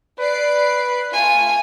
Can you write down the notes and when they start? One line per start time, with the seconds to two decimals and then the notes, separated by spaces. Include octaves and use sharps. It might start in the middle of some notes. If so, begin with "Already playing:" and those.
0.20 B4 D5 C7 D7
1.13 A3 F4 G#5